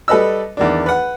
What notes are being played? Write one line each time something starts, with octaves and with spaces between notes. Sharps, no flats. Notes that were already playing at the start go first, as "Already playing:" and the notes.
G3 A4 B4 D#5 E6
E2 D#3 D4
B4 F#5